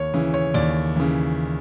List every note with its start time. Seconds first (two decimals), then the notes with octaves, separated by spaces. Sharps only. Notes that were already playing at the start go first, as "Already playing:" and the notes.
Already playing: D#2 C#5
0.14 C#3 E3
0.34 C#5
0.54 D#2 D5
0.96 C#3 E3